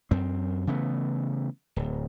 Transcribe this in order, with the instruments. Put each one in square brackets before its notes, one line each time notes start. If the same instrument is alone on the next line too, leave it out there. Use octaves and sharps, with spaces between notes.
[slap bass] F#2 C4
C#3 E3 A3 B3
D1